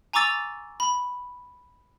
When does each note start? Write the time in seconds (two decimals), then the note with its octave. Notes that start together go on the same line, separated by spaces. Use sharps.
0.13 G#5 A#5 C#6 D6 E6 A6
0.80 B5